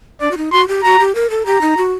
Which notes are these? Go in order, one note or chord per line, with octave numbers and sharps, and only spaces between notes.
D4 D5
F#4
D#4
F#4 C6
G4
F#4 A#5
G4
A#4
A4
G4 A#5
D#4
F#4